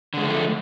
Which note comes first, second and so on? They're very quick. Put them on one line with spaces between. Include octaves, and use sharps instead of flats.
D3 G#3 F3 A3